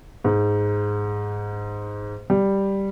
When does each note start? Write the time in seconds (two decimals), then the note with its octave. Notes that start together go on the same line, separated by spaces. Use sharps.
0.25 G#2
2.30 G3